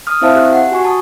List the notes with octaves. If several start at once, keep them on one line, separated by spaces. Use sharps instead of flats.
D#6 F6
C4 E4 C5 E5 F5 A5
G4 F#6
F#5
F#4 G#5 C#6
A5 D#6